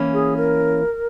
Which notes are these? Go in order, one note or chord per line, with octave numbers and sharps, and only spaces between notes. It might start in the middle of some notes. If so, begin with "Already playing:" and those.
Already playing: E3 A#3 C#4
G#4
A#4